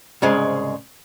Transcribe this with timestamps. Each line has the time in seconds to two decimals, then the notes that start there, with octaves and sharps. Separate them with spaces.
0.22 C2 G#2 C#3 G#3